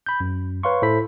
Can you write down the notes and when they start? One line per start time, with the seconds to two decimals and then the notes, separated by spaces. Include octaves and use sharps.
0.06 B5 G6
0.20 F#2
0.63 B4 C#5 F5 C6 C#6
0.82 A2 E4 A4 C5 B5 B6